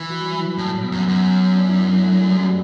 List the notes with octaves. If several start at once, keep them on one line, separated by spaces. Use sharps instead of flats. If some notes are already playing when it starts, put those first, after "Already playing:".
Already playing: E3
F#4
G3
F#3
F#3
A2 G3
B3
F#2
F#2
D4
E4
A3
G3
F#3
G3